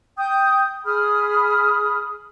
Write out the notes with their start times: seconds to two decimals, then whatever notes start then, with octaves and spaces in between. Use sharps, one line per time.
0.18 G5 D#6 G6
0.84 G#4 B5 D#6 F6